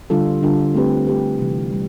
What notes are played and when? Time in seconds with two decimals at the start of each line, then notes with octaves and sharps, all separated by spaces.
0.10 D3 G3 D4 F4 A4
0.43 D3 G3 D4 F4 A4
0.74 A3 C4 G4 B4
1.07 A3 C4 G4 B4
1.39 C3 E3 G3
1.72 G3